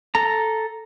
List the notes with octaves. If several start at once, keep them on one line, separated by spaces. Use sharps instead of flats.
A4 A#5